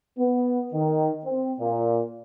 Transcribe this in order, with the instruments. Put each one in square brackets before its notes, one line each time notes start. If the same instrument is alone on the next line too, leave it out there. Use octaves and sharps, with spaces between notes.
[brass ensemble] B3
D#3
C4
A#2